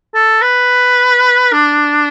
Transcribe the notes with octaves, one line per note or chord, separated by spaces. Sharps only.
A4
B4
D4